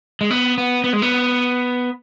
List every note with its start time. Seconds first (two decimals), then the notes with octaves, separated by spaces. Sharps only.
0.21 G#3
0.30 B3
0.58 B3
0.84 B3
0.93 G#3
1.02 B3